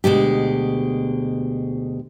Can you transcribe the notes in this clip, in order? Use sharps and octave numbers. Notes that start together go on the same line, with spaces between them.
D2 B2 G#3 G4